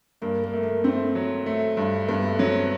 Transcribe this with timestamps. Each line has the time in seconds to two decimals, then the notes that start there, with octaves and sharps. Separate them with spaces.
0.22 G2 A#3
0.43 A#3
0.53 A3
0.63 A#3
0.84 A3 C4
1.15 F#3
1.46 A3
1.77 G2
2.08 G2 B3
2.23 A3
2.39 F#3 C4
2.55 B3